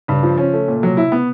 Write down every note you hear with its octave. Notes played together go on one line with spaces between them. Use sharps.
G2 C#3
F3
C#4
A3
A#2
C3 F#3
E4
B3